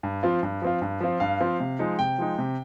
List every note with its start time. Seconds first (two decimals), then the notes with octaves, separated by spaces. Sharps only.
0.03 G2
0.23 F3 C4 F4
0.43 G2
0.62 F3 C4 F4
0.82 G2
1.01 F3 C4 F4
1.20 G2 F5
1.40 F3 C4 F4
1.60 C3
1.79 F3 G#3 D#4
1.99 C3 G5
2.18 F3 G#3 D#4
2.38 C3